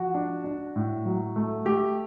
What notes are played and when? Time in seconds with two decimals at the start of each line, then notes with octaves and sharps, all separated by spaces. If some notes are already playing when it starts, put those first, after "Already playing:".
Already playing: F3 F#4
0.14 D4
0.44 D4
0.76 A2
1.05 F#3
1.36 A3
1.65 A3 G4